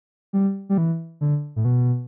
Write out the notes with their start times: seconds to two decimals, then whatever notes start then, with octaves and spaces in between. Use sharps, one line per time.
0.33 G3
0.69 G3
0.78 E3
1.21 D3
1.56 A2
1.65 B2